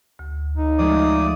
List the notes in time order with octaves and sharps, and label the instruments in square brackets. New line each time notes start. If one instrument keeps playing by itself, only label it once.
[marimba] D2
[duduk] D#4
[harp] F3 G#3 A3 [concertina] D5 D#6